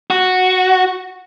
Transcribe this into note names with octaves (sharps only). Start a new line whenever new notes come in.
F#4